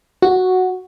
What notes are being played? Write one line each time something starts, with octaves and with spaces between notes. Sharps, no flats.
F#4